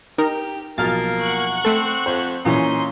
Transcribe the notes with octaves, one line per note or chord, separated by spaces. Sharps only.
D#4 G4 A#4
B1 F3 A#3 F6 A6
F#5 C#6 F#6
A3 C4 A4
F2 C5
A#2 E3 C#4 D#4 C6